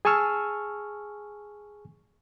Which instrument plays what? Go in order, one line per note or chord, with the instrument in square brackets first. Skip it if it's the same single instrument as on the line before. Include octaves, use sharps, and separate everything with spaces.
[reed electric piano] G#4 G#5 A5 C#6 E6 F6